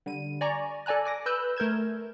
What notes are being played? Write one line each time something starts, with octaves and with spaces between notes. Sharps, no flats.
D3 G3 D#7
D5 G#5 A#5 C#6
A4 D5 G#5 A#5 F#6
G#5 D6 A#6
B4 E6 F#6 G6
A3 A#4 G6 G#6 E7